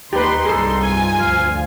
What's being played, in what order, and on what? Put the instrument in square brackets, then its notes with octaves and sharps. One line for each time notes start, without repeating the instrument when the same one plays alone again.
[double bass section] D#2 [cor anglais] D#4 [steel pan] G4 B4 [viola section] C6
[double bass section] C2 G2 G3 [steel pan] G#4 A4
[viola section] F4 G#5
[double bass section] D2 F3 [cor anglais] F5